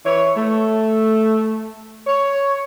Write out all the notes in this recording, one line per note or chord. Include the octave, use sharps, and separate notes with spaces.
E3 B4 C#5
A3
C#5